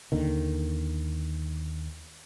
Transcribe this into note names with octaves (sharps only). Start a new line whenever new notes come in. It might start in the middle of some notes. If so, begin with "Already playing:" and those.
D#2 D3 D#3